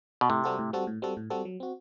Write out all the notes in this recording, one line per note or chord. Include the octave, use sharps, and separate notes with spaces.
B2
A2 C3
G3 C4 F#4 A4
A2
G3 C4 F#4 A4
A2
G3 C4 F#4 A4
A2
G3 C4 F#4 A4
F#3
C4 F#4